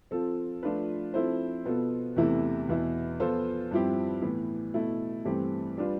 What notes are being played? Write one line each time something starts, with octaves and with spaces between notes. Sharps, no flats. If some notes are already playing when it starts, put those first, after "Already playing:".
F3 C4 F4 A4
F3 A3 D4 F4 B4
F3 C4 E4 A4 C5
B2 B3 F4 A4
E2 C3 E3 A3 E4
E2 B2 B3 E4
F3 B3 F4 A4 C5
G2 F3 C4 E4 G4
A2 E3 B3
B2 A3 E4
G2 E3 A3 C4 G4
G3 D4 F4 B4